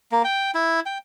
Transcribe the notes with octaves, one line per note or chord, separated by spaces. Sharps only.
A#3
G5
E4
G5